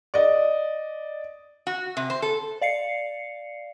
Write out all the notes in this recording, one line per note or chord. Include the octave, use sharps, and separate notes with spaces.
D5 D#5
F#4
C3
C5
A4
D5 F5 C7 C#7